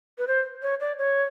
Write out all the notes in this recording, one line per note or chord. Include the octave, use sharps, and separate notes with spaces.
B4
C5
C#5
D5
C#5